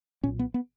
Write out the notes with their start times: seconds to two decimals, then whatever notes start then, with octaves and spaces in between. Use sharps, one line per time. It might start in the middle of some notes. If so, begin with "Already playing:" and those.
0.24 B1 A#2 C#4
0.39 B3
0.54 B3